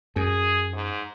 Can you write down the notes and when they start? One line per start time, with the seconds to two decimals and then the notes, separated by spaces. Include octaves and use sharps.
0.16 F#2 G#4
0.73 G#2